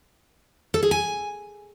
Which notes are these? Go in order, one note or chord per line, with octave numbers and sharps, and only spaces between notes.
A4
G#4
G#5